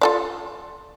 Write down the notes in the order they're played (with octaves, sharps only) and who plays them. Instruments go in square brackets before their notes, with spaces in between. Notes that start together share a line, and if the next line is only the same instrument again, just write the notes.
[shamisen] F4 A4 D5